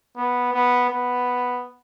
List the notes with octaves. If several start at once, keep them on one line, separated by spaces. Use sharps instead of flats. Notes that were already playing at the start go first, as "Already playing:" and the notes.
B3
B3
B3